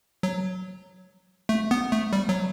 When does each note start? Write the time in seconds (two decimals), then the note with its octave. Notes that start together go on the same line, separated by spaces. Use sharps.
0.23 F#3
1.49 A3
1.71 B3
1.92 A3
2.13 G3
2.29 F#3